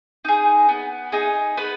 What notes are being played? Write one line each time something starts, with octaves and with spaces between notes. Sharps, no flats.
D#4 G#4
B3
D#4 G#4
B3 B4